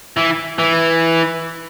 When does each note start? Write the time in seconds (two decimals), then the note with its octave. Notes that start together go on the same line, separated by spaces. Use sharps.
0.17 E3
0.59 E3